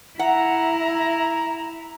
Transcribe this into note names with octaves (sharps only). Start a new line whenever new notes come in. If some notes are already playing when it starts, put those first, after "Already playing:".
E4 E5 F#5 A#5